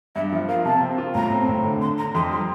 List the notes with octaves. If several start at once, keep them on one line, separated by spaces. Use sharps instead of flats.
G2 E5
F3 E5
A#3 F5
C3 A5
C4
F4
A2 A#5
C4
A2
D3
D4 C6
D3 A#5
F2 C6
G3 C6